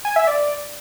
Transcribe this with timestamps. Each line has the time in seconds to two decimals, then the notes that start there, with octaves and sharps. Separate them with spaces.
0.05 G#5
0.16 E5
0.27 D5